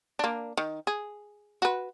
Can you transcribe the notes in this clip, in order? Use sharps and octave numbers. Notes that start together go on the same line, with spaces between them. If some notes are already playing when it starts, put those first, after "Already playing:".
A#3 D4
D#3
G#4
F#4 B4